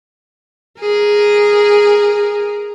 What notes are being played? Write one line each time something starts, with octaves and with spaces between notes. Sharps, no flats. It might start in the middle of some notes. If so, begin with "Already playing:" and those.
G#4 A#4